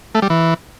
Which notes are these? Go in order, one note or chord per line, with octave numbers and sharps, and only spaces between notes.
A3
G3
E3